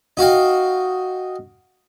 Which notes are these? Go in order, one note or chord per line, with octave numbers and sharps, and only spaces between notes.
D#4 F#4 F5 G5